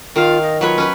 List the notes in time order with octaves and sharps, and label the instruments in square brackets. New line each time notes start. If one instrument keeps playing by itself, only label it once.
[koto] D#3 F5 [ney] F4
[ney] D#5
[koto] F#3 B4 C#5 [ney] F4
[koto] C#4 B4